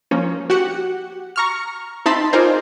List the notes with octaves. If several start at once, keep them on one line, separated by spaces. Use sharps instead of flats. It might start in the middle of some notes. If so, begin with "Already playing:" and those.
F3 A#3 C#4
F#4 G4 F#5
A#5 C#6 F6
C4 D#4 E5 A5 B5 C6
D#4 F4 G#4 A#4 C5 D5